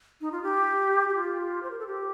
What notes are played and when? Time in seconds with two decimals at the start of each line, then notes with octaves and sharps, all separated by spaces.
0.21 D#4
0.32 F4
0.43 G4
1.09 G4
1.15 F4
1.63 C5
1.71 A#4
1.79 A4
1.87 G4